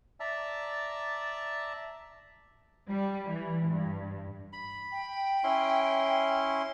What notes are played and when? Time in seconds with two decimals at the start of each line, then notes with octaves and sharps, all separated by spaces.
0.20 D5 E5 A5 A#5 E6
2.87 G3
3.30 E3
3.67 G2
4.53 B5
4.92 G5
5.44 C#4 E4 C6